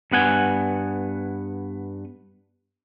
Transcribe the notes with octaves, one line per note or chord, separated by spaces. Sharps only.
G2 B3 F#5 G#5